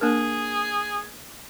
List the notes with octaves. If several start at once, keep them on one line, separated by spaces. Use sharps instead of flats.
A#3 D4 G#4 A#4